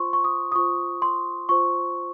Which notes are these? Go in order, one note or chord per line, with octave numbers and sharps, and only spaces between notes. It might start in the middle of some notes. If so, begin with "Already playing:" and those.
Already playing: F4 C5 C6 C#6
C#6
D#6
D#6
F4 C5 C#6
C6
F4 C5 C#6